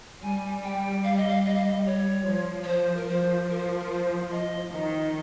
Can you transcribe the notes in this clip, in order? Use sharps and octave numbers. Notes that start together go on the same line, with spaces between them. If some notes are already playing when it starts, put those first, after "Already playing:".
G3 G#5
G5
F5
D#5
F5
G3 D#5
F5
D#5
C#5
F3
C#5
C5
A#4
F3 C5
A#4
C5
A#4
A#4
C5
D#5
D#3 D#5